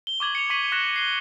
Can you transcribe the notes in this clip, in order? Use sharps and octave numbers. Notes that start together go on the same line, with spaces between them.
G7
C#6 D6 G#6 F#7
C#7 F7
C#6 B6 D#7 F#7
C#6 F#6 A#6 E7
C7 G7